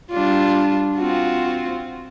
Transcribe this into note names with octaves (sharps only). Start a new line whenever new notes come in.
G3 D4 F4
C4 F4 F#4